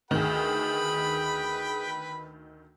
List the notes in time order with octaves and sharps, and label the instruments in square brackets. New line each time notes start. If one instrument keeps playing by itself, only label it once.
[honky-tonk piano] D2 D#3 [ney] G#4 [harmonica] B4 G5 B5